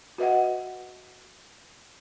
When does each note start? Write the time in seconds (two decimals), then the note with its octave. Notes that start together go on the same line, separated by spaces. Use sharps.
0.18 F#4 B4 D#5 E5 F#5